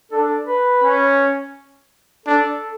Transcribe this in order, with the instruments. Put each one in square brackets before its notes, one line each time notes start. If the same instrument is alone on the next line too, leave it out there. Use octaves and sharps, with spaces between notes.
[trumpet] D4 [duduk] A4
[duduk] B4
[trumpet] C#4
[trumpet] D4 [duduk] A4